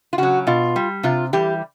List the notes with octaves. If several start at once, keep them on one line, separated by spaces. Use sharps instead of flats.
F4
C#3 F#3 F#4
B2 F4
G3
C3 F4
E3 G3 G4